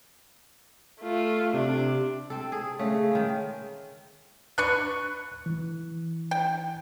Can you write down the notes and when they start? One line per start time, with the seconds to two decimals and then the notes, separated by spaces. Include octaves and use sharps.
1.00 A3 F4
1.54 C3 D4
2.30 C4 A4
2.52 G#4
2.79 C#3 A3
3.12 D#3 G#3
4.58 D4 B4 C#6 F#6
5.46 E3
6.31 G5